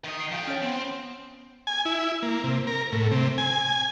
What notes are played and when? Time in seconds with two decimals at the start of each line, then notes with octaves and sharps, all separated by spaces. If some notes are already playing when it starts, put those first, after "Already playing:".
0.04 D#3 D#5
0.20 C7 D7 G7
0.32 F3 G5
0.48 C#4 C#5
0.62 B3 C4
1.67 G#5
1.85 E4
2.23 A#3
2.44 C3
2.67 A#4
2.92 A2
3.11 C3
3.38 G#5